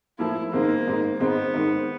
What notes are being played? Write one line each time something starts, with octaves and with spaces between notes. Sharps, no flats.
A2 F3 A#3 E4
G#2 D#3 G#3 A#3 C4 D#4
G#2 D#3 G#3 C4 D#4
G#2 D#3 G#3 B3 C4 D#4
G#2 D#3 G#3 C4 D#4